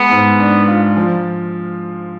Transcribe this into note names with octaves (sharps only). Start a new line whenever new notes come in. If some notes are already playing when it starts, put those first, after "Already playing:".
Already playing: G#3 B3
G#2
D4
F4
F3